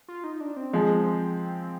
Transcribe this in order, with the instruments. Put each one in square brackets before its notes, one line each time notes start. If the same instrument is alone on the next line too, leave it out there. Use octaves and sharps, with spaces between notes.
[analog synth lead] F4
D#4
D4
C4
[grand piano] F3 G#3